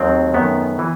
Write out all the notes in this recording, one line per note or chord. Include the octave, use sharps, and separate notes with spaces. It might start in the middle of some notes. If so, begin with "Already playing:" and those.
Already playing: D#2 D#3 F#3 A3 C4
F#2 D#3 A3 B3
E3